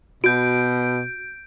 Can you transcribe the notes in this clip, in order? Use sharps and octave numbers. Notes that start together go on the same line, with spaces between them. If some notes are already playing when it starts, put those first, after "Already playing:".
B2 F#4 G6 D7